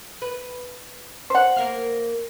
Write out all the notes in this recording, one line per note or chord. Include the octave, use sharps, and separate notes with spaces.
B4
C5 F#5
A#3 A#4 F5